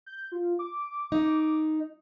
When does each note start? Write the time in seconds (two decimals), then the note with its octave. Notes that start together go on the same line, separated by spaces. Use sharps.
0.06 G6
0.32 F4
0.59 D6
1.12 D#4